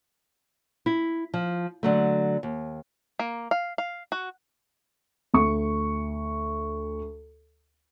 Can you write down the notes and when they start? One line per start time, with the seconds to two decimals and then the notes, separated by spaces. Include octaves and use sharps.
0.86 E4
1.34 F3
1.83 D3 F#3 A3
2.43 D#2
3.19 A#3
3.51 F5
3.78 F5
4.12 F#4
5.34 D2 C#6